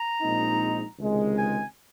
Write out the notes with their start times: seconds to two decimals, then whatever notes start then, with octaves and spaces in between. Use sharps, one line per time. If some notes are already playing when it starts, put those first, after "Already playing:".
Already playing: A#5
0.21 A#1 A#2 G#3 C4 D#4
0.98 C#2 C3 D#3 G#3
1.38 G#5